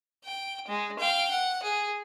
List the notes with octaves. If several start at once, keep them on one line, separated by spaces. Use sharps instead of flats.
G5
G#3
F5 G5
F#5
G#4